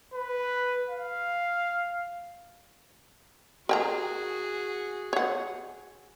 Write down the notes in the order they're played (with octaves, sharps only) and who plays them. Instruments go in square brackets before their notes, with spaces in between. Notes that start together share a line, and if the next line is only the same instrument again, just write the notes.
[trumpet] B4
F5
[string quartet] F#4 G#4 [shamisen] A#4 G5 A#5
[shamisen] C#5 F#5